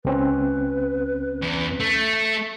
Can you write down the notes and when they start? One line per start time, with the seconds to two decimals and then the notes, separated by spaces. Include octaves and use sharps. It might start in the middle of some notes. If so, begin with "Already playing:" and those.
0.05 C#2 C4 C#4 B4
1.42 E2
1.80 A3